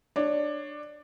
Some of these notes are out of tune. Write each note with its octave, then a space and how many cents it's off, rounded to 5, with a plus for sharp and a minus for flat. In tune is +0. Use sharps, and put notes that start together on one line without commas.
D4 +15 C#5 +5